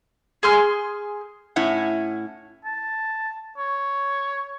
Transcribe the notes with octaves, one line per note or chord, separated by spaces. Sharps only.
G#4 C6 F6
A2 C#4 E4 F#5
A5
C#5